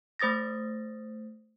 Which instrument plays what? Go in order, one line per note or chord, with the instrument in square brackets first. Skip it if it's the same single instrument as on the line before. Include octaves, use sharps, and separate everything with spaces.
[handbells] A3 C5 D#6 A6 A#6